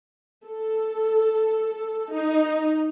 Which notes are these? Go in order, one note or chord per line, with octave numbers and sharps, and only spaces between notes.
A4
D#4